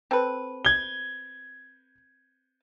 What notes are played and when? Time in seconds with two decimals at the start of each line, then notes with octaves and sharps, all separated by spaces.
0.11 C4 A4 B4
0.65 G#6 G7